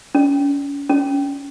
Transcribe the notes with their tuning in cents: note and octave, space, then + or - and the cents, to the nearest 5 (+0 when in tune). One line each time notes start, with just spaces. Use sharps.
C#4 +30
C#4 +20